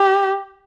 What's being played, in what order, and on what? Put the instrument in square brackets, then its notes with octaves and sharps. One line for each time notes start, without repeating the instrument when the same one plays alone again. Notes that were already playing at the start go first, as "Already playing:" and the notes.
Already playing: [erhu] G4